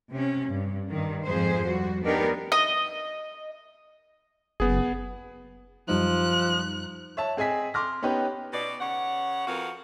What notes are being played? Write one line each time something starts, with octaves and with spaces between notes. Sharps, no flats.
C3 C#4
G2
G2 D#3
F2 G#2 G#4 C5
G3 F#4
B3 D4 D#4 G4 A#4
D#5
F#1 B3 G#4
F#2 F3 G3 D#4 F#6
C#5 E5 A5
C4 G#4 D#5 G#5 B6
C6 D6 F6 A#6
B3 C#4 D#4 G4 B4 C#5
B2 D5
C#3 C#5 F#5
F2 F#4 A#4 B4 F5